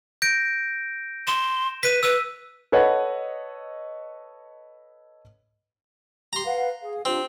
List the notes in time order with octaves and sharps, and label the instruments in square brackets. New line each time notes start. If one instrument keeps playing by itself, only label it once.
[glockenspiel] G6 A#6 D7
[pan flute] C6 [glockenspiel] E7
[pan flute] B4 [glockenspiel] B6 D#7
[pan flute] B4 [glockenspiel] E6
[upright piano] A4 B4 C#5 D#5 F#5
[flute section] G4 [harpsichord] A#5 C6
[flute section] B4 F5 F#5
G#4 F5
[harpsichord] C4 [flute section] D4 F4 G4